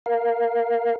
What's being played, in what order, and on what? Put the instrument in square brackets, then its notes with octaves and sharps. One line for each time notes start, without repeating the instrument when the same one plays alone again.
[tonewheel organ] A#4 F5